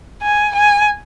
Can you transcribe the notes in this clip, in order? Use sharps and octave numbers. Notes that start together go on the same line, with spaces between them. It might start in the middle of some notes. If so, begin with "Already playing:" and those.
G#5
G#5